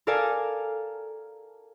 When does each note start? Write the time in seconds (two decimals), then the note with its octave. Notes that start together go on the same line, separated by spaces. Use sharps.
0.07 A4 A#4 D5 F5 G#5 A5